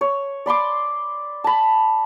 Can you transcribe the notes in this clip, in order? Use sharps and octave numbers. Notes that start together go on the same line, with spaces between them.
C#5
D5 B5 C6 D6
A5 B5